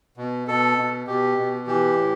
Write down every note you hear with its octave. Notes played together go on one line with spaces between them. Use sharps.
B2
B2 A4
B2
B2 G4
B2
E3 G4
A2